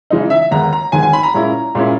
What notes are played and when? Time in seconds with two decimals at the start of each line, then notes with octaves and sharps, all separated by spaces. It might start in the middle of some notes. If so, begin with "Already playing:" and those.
0.10 C#3 E3 G#3 D#4
0.30 E5
0.51 D#2 D#3 G#3 B3 A#5
0.73 A#5
0.92 D#2 D#3 G#3 B3 G#5
1.03 G#5
1.13 B5
1.23 A#5
1.34 A#2 G#3 C#4 E4
1.75 A#2 G#3 C#4 E4